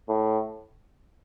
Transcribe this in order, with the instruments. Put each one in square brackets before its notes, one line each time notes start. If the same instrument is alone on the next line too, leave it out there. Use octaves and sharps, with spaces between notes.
[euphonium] A2